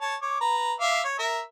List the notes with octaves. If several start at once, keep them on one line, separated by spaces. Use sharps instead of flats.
C#5 A5
C#5 D6
B4 A#5
E5 F5 D6
C#5
A#4 E5